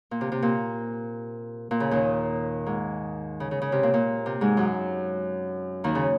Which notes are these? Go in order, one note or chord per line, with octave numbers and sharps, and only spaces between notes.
A#2
C3
C3
A#2
A#2
C#3
D#2 D#3
G#2
C#3
C#3
C#3
C3
A#2
A#2
C3
G#2 G#3
F#2 F#3
D#2 D#3
C#3